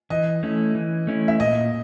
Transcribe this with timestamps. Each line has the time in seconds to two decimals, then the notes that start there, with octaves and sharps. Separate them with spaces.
0.10 E3 D#5
0.43 A3 C#4 E4
0.75 E3
1.07 A3 C#4 E4
1.28 E5
1.40 A#2 D#5